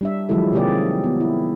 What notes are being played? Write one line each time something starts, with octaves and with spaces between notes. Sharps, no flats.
G3 D4 E5
D#3 F3 F#3 G#3 E4 A4
C3 D#3 A#3 G4 G#4 D5
B3
E4